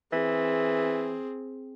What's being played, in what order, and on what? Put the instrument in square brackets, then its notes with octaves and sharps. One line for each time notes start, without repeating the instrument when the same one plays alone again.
[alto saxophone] E3 [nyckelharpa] C4 G#4